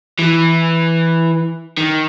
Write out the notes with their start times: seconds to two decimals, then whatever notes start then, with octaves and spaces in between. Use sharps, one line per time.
0.19 E3
1.78 D#3